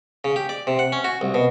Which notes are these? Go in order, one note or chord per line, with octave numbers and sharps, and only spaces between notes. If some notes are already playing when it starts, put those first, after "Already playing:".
C#3
G4
D5
C3
F#5
C#4
F#4
C2
B2